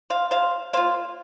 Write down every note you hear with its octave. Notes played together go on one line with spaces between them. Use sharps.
C5 F5
C3 C5 F5
A#3 F4 C5 F5